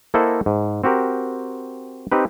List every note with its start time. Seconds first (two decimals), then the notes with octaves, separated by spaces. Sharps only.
0.14 A#3 E4 A4 C5 D#5 F#5
0.46 G#2
0.84 C4 F#4 G4 A#4
2.12 C4 D#4 G4 B4